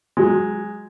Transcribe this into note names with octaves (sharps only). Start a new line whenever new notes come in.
F#3 G#3